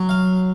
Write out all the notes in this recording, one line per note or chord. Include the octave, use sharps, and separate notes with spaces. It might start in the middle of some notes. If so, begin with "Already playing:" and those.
Already playing: F#3
F5